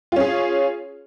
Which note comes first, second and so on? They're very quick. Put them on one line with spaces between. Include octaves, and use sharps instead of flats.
F4 C#4 G#4